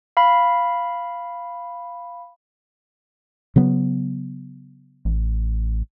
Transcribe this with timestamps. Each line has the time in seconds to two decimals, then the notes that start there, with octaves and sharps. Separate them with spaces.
0.17 F5 B5
3.56 C#3 F#3 B3
5.05 A1